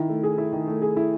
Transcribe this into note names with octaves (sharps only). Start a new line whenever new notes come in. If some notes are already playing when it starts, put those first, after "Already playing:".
Already playing: D#3 E4
A3
G#4
E4
D#3
A3
G#4
E4